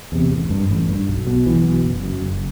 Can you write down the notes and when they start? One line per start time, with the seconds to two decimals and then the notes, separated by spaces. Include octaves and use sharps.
0.12 E2 C3
0.31 A1
0.50 G2
0.69 A1
0.89 G2
1.08 B1
1.27 B2
1.46 B1 E3
1.64 B2
1.84 F#1
2.03 F#2
2.22 F#1